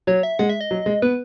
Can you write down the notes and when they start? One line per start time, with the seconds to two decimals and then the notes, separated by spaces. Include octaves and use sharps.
0.07 F#3 C#5
0.23 E5
0.39 G#3 F#5
0.49 E5
0.61 D#5
0.71 F#3
0.86 G#3
1.02 B3 B4